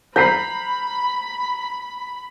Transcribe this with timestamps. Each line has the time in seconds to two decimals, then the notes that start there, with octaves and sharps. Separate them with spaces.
0.16 A#5 B5 G6 B6 C7